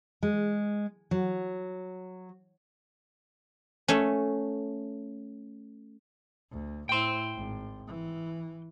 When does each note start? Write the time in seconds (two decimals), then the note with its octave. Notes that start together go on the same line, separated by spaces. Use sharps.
0.23 G#3
1.11 F#3
3.88 A3 C#4
6.51 D2
6.89 A2 E4 G5 C6
7.35 G#1
7.87 E3